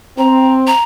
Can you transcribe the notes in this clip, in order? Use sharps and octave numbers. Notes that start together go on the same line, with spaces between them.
C4 A#5
A#5